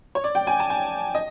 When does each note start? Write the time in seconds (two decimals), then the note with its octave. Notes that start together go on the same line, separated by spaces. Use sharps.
0.15 C#5
0.24 D5
0.35 G5
0.47 G#5
0.60 A5
0.70 G#5
1.15 D#5